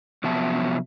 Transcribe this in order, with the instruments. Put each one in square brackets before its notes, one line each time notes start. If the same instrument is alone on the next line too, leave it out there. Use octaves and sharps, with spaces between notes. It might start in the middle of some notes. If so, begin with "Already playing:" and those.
[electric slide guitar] C3 F3 F#3 B3 E5 A5